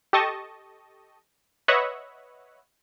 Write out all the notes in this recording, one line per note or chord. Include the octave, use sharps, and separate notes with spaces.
G4 A4 D#5 A5 C#6
B4 C#5 D#5 E5 F#5